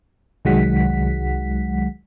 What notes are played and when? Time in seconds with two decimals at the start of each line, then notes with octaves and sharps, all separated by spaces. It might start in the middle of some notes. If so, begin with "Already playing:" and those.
0.45 C2 D#3 F#3 G#3 F#5 B6